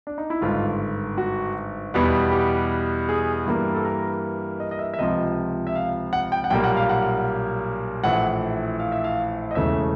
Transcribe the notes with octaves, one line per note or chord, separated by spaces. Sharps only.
D4
D#4
E4
G#1 G2 D3 F4
F#4
E2 B2 G3 B3
G4
G#4
G2 E3 G3 A#3
A4
A#4
D#5
D#5
E5
E5
C#2 C3 F3 D#5
E5
F5
F#5
G5
F#5
B1 A#2 G3 A#3 G5
F#5
F5
F#5
A#1 A2 E3 F#5
F5
E5
F5
D#5
E1 E2 C#3 E3 A3 E5